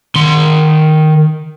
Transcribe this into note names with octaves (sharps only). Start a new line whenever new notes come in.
D#3 C6